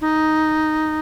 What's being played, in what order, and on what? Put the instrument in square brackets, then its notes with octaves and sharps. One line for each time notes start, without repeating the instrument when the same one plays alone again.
[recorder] D#4